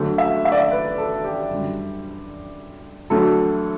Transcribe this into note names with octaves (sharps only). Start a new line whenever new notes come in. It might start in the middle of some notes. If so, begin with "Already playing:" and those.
Already playing: D2 D3 F#3 A3
E5
E5
D5
E5
B4
A4
G4
F#2 D3 G3
D2 D3 F#3 A3 A4